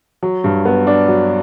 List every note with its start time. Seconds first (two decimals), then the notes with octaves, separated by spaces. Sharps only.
0.23 F#3
0.44 G2
0.65 B3
0.87 D4
1.08 F#3